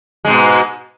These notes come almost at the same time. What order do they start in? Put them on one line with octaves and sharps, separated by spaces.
G#3 G#2 B2